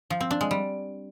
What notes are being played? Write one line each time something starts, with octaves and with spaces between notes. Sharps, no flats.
F3
C4
D4
G#3
G3